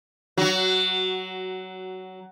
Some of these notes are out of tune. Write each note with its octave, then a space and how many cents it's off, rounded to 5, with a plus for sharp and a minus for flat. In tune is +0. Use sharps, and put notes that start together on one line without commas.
F#3 +15 F#4 +5